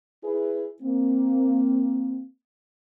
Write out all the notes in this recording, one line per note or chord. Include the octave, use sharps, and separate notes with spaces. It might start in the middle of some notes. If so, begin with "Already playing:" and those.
E4 G#4 B4
A#3 C4